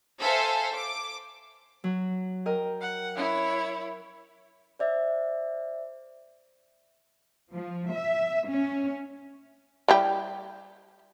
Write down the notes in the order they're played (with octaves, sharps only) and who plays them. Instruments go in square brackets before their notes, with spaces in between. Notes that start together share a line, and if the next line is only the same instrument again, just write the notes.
[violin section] A4 C5 E5 F5 G#5
D6
[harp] F#3
A#4 D#5 G5
[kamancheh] F#5
E4 C#5
[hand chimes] C5 D5 E5
[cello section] F3
E5
C#4
[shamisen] G3 E4 G4